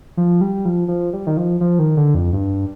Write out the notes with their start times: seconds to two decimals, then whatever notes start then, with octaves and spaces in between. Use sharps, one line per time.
0.17 F3
0.41 G3
0.65 F3
0.88 F3
1.13 G3
1.27 D#3
1.37 F3
1.61 F3
1.79 D#3
1.97 D3
2.15 F2
2.33 G2